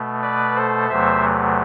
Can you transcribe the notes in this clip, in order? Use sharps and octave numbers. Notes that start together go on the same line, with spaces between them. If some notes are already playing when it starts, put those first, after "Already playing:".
Already playing: B2 A3
B4 D5
A4 C5
E2 C3 F#3 A3 C5 E5